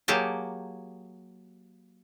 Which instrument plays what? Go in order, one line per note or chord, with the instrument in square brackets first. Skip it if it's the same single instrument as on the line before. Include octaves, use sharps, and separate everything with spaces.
[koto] F#3 A#3 G4 G#4 A5